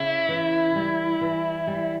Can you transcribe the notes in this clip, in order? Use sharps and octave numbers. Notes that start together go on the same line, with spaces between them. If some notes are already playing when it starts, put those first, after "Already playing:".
Already playing: C#3 E4
E3
G3
E3
G3